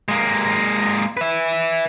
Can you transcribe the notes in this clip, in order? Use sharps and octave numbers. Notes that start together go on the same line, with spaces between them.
G#3 A#3
B4 E5